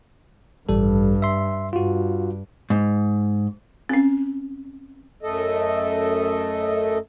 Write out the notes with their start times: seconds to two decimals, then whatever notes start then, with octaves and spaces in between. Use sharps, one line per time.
0.69 A1 G2 G3 A4
1.22 E5 C6
1.73 G2 F4 F#4
2.70 G#2
3.89 C4 C#4
5.23 F#2 A3 A4 D#5